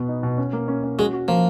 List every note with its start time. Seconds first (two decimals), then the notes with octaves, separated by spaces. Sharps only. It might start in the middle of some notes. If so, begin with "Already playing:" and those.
Already playing: B2 B3
0.08 D#4
0.23 B2
0.38 C#4
0.53 A#3
0.68 C#4
0.84 C#4
0.98 G#3 F#4
1.13 F#4
1.28 F3 A#3